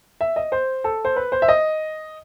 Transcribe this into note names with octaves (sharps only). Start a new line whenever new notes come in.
E5
D#5
C5
A4
C5
B4
C5
E5
D#5